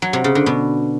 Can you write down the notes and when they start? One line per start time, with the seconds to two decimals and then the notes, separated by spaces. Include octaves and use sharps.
0.02 F#3
0.13 C3
0.24 C#3
0.35 D3
0.46 B2